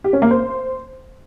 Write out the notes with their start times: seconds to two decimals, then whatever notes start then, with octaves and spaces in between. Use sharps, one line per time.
0.04 G4
0.13 C#4
0.22 A#3
0.31 C5